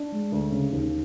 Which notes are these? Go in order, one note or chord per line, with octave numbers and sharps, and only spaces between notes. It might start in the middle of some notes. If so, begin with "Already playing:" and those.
Already playing: D4
G#3
D2
C#3
D#2